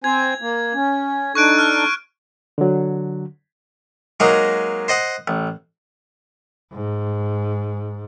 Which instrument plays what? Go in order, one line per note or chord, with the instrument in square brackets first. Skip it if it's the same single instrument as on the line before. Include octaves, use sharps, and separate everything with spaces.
[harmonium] C4 C5 G#5 [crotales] G#6
[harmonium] A#3
C#4
[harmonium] D4 D#4 A4 [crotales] C#6 F#6 D7
[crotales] F6
[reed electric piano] D3 F#3
[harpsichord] F#3 G#3 A#3 D#4
C5 D#5 F#5
A1
[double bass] G#2